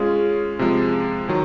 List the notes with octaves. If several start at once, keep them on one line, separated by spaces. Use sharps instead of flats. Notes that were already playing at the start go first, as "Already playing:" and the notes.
Already playing: G#3 C#4 F4 G#4
C3 F3 G#3
D#3 F#3